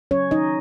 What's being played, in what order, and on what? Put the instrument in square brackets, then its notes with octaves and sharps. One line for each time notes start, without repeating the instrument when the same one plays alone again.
[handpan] F#3 C#4 C#5
D#4 D#5